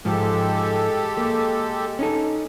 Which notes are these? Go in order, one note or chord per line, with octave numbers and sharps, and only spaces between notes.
G#2 F3 G#3 G4 A4
A#3
C#4 D#4 A4